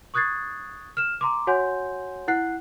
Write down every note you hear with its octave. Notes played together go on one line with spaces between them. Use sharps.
C#6 D#6 F#6 G#6 A6 C7
F6 E7
A#5 C6 D6
F#4 C#5 F#5 G#5 C6 G6
E4 F#5 F#6 C7